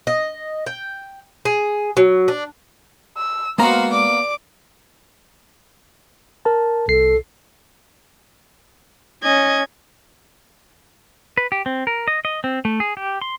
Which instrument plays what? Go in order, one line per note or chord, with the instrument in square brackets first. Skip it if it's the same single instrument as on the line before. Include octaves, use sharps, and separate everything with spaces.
[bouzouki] D#5
G5
G#4
F#3
D4
[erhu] E6
[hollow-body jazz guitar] G#3 A#5 [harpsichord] A#3 B3 A#4 [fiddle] F#4 F5 [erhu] C5
[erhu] D5 [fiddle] D6
[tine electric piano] A#4 A5
[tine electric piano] C2 C7 [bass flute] A4
[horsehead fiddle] C#4 [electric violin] D#5 G#6
[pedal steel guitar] B4
G4
C4
A#4
D#5
D#5
C4
A3
G#4
G4
C6